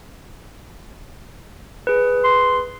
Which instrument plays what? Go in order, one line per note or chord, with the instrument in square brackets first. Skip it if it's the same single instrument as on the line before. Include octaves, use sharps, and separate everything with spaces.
[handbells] G#4 B4
[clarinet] C6